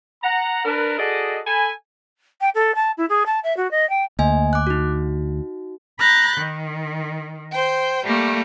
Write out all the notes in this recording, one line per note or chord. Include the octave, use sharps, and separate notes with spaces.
F#5 A#5
D4 A#4 B4
F#4 G#4 A4 D5 D#5
A4 G#5 B5
G5
A4
A5
E4
G#4
A5
E5
F#4
D#5
G5
D2 A#3 D#5 G#5
D6 F#6
D#4 F#4
A#5 B5 F#6 G6 A6
D#3
C5 G5
G3 A3 A#3